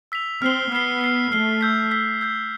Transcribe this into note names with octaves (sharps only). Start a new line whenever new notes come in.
E6 B6 F7
C4 F6 C7 G7
B3 F6 C7 G7
F6 C7 G7
A3 F6 C7 G7
E6 G6 B6
E6 G6 B6
E6 G6 B6